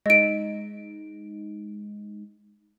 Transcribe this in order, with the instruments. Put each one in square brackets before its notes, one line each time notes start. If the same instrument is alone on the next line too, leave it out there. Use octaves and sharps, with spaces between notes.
[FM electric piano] G#3 D#4 [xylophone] D#5 D7